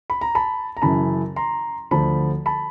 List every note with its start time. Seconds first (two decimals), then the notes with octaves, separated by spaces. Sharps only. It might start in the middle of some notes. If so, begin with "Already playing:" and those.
0.10 B5
0.21 A#5
0.35 A5 B5
0.77 A#5
0.82 F#2 C#3 E3 A5 B5
1.36 A#5 C6
1.91 D2 D3 F3 A5 B5
2.46 A5 B5